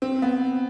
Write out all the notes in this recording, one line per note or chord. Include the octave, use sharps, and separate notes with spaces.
C4
B3